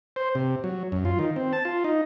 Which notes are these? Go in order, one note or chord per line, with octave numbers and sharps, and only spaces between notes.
C5
C3
F#3
F#2
F4
D#3
C4
A5
F4
D#4